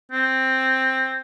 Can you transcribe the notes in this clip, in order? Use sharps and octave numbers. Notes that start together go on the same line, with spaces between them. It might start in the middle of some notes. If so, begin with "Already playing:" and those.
C4